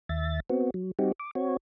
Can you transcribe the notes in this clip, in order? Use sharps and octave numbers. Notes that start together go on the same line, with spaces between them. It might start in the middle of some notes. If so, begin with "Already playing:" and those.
D#2 E5 A6
B3 C4 F#4
F#3
G3 C4 D#4 F#4 G4
D6
C4 F#4 C#5